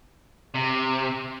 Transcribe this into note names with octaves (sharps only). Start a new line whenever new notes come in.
C3